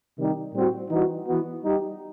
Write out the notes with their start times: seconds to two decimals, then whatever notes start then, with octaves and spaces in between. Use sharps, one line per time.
0.18 C3 D#3 G3 D#4 G4
0.53 A2 G3 C4 F#4
0.91 E3 G3 D#4 F#4
1.26 E3 B3 F#4
1.63 G3 D#4 G4